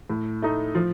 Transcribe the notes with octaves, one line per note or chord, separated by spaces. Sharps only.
A2
A3 D#4
F3